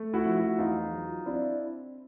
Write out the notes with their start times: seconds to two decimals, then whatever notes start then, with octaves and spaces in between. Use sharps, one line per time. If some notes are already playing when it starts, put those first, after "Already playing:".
Already playing: A3
0.14 E4 F#4
0.25 F3
0.36 E4 F#4
0.58 E2 D#4 F4
0.92 F#3
1.26 C4 D4 E4